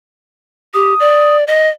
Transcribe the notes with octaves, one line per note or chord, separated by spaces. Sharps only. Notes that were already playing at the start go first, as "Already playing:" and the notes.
G4 D#6
D5
D#5